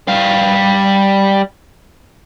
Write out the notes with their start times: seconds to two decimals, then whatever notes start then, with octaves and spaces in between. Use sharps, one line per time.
0.08 G3 F5